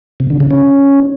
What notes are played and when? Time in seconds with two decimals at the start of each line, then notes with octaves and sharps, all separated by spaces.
0.20 C3
0.30 D3
0.40 C#3
0.51 C#4